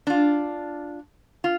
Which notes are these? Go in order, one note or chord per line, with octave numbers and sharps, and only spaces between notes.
D4 F4
F4